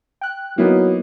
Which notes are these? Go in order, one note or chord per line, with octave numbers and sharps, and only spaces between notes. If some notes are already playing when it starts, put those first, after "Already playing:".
G5 F#6
F#3 A#3 B3 D#4 E4